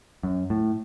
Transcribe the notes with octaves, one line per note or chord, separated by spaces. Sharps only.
F#2
A2